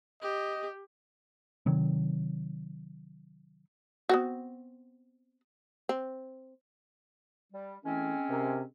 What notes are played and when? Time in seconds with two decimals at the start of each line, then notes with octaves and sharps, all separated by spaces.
0.22 G4 D#5
1.66 C3 D#3 F#3
4.09 B3 C4 F#4
5.89 C4
7.53 G3
7.84 E3 G#3 A3 C4 C#4
8.29 C3 A#4